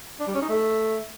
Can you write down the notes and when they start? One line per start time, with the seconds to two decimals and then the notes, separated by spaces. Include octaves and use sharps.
0.20 D4
0.27 G3
0.34 C#4
0.42 D#4
0.49 A3